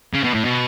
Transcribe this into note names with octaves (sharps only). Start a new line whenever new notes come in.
C#3
B2
A2
B2